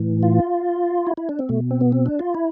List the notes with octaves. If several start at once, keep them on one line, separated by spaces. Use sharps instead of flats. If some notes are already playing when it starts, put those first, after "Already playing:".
Already playing: A2 E3
F4
E4
E4
D4
C4
B2 A3
C4
B3
C4
D4
F4
E4